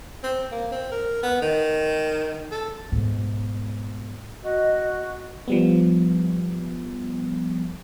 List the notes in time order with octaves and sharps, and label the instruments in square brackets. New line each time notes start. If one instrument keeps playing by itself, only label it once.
[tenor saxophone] C4
A#3
C4
A#4
B3
D#3
A4
[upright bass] G#2 B2
[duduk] F#4 [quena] D#5
[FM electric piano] F3 G3 B3